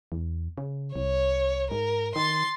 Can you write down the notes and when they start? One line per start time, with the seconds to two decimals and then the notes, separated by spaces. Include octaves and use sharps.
0.12 E2
0.58 C#3
0.96 C2 C#5
1.71 G#2 A#4
2.16 D#3 C6 A6